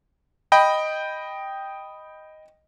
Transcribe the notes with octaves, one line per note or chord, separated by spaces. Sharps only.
D#5 G5 B5